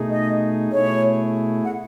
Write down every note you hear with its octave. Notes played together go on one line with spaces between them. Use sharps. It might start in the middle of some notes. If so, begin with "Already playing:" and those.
Already playing: B2 A3 D#4 G#4
D#5
B2 A3 E4 G#4 C#5
F#5